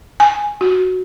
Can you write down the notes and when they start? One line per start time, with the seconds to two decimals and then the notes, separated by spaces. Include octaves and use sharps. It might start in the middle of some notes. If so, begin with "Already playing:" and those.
0.20 G#5
0.61 F#4